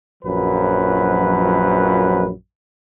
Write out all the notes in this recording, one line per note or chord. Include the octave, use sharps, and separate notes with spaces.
A#1 F#2 F3 F#3 B4